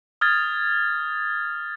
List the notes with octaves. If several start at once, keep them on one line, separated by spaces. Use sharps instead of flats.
D#6 F6 G#6 A6